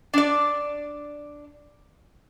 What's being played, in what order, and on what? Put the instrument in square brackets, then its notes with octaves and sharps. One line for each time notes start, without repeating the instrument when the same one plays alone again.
[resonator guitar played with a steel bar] D4 D5